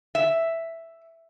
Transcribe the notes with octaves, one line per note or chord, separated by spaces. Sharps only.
E5